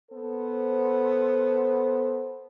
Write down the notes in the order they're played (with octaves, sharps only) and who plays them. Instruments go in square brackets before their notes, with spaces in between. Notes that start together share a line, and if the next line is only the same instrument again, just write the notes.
[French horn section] B3 A4 C5